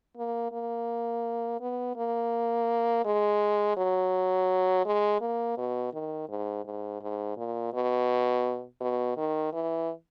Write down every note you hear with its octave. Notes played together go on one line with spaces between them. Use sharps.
A#3
A#3
B3
A#3
G#3
F#3
G#3
A#3
B2
D#3
G#2
G#2
G#2
A#2
B2
B2
D#3
E3